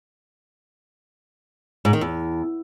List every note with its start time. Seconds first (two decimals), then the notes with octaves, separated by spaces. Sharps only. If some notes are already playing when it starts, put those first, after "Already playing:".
1.85 G#2
1.93 D#3
2.01 E2